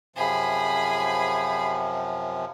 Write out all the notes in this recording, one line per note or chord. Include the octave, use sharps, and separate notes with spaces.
F#2 C3 F3 G#4 B5